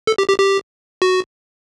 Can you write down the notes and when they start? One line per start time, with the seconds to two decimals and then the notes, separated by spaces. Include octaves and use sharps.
0.07 A4
0.18 G4
0.29 G4
0.39 G4
1.02 F#4